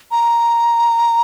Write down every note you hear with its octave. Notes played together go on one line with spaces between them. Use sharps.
A#5